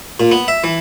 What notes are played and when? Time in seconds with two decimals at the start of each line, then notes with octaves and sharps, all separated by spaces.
0.20 A#2
0.32 B3
0.48 E5
0.64 E3